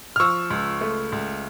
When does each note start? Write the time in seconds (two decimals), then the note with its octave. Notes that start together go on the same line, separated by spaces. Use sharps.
0.16 F6
0.20 F3 C#6 E6
0.50 C#2
0.81 A3
1.12 C#2